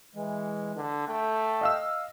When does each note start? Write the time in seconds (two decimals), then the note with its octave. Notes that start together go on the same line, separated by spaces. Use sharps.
0.15 E3 G#3
0.77 D3
1.08 A3 G5
1.61 D#5 F5 E6